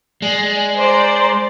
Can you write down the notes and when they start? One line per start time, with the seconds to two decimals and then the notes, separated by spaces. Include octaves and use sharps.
0.22 G#3 D5 G#5
0.77 C5 D5 A#5 C6